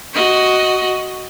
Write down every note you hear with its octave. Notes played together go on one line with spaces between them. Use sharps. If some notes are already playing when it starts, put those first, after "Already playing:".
F#4 D#5